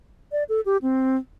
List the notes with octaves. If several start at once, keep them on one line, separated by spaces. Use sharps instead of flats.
D5
A4
G4
C4